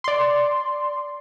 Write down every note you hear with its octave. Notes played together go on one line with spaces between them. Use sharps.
D5 C6